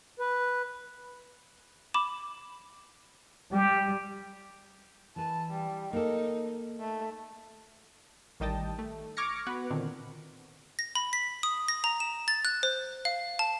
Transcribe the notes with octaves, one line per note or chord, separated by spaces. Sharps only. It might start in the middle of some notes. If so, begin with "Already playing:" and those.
B4
B5 D6 E7
G3 G4
E3 B4 A5
G3
A#3 D#4 A4
A3
A1 D#3 G3 D#5 G5 A5
A3
C#6 D6 F6 G#6 A#6 C#7
B3 F#4 B4
A#2 D3 D#3 C4
A#6
B5
B6
D#6
A#6
A#5
E7
A6
F#6
C5
F5
A5